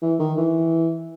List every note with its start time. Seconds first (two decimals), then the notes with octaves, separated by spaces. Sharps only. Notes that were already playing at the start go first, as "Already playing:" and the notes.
0.02 E3
0.19 D#3
0.37 E3